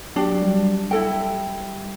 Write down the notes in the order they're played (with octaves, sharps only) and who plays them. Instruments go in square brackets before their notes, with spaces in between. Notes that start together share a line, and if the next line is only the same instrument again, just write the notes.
[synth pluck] F#3 G4 [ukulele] D4
[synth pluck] G3
[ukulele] E4 A4 G5